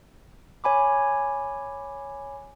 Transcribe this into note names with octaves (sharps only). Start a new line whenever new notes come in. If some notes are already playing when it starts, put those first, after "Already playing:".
C#5 G#5 B5 D6